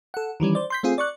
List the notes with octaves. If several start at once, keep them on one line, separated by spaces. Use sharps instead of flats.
A4 F#5
D#3 E3 G3 C#4
C5 D5
C6 G6 B6
A3 C4 F4 G#4
D5 C#6 F#6